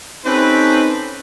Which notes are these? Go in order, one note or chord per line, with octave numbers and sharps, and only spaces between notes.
C4 C#4 D#4 G4 A4 B4